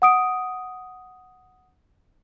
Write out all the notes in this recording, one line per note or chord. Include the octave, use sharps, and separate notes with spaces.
F#5 D#6 D7